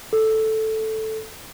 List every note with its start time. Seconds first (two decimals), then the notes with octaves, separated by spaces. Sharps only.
0.13 A4